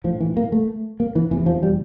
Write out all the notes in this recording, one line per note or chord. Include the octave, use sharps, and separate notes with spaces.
A#1 A2 F3
E3
A#3
A3
A#3
E3
F1 E2 C3 E3
F3
G3